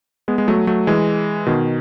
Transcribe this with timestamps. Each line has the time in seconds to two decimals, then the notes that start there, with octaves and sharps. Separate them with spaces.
0.28 G#3 B3
0.38 G#3
0.48 F#3 A3
0.67 F#3 A3
0.87 E3 G#3
1.46 B2 D#3